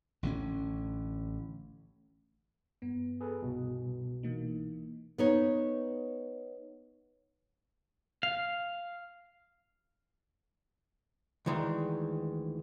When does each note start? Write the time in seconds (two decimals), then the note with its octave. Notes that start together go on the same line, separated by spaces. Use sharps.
0.23 A1 D3 G3 C#4
2.82 G2 B3
3.21 G#4 A4 B4
3.41 C2 B2
4.23 E3 A#3 D#4
5.18 B3 D#4 C#5
8.23 F5
11.46 D2 D#3 E3 G#3